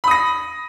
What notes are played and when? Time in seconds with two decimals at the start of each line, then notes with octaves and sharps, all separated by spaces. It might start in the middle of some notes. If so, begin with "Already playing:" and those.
0.04 B5
0.07 D#6
0.11 A#6